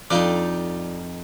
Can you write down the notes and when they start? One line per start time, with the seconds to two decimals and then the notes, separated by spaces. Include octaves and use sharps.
0.10 F2 D#4 F4 D5